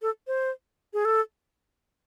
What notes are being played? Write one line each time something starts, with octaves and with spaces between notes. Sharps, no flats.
A4
C5
G#4
A4